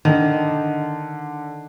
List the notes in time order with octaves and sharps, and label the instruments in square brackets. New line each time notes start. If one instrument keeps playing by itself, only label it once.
[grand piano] D3 [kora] D#3